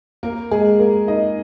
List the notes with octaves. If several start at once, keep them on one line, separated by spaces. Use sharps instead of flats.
A#3 A#4
G#3 G#4
A#3 A#4
D#4 D#5